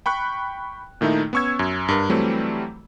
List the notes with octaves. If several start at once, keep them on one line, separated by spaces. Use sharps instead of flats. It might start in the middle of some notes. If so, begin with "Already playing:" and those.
G5 B5 C#6 F#6
A#2 D#3 A3 D#4 E4
B3 C#4 C#6 E6 G#6
F#2
G2 A#4
E3 F#3 G3 A3 C4